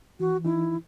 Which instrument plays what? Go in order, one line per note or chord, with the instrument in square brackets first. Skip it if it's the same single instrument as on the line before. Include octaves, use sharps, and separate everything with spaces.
[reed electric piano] E3 [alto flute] F#4
[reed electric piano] E3 D#4 [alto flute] E4